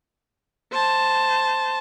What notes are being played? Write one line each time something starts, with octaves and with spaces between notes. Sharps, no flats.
C5 A5